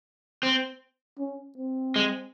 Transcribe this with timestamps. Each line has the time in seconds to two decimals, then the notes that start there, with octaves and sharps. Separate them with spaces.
0.43 C4
1.19 C#4
1.58 C4
1.96 G#3